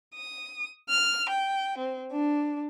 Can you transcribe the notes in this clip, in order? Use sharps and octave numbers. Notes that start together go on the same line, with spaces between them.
D#6
F6
G5
C4
D4